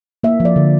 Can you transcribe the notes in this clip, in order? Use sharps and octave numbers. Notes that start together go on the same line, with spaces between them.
A#3 E5
F3
D5
D3